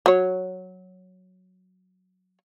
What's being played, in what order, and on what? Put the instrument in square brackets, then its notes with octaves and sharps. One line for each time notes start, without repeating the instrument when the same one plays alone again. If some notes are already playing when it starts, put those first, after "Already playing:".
[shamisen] F#3 C#5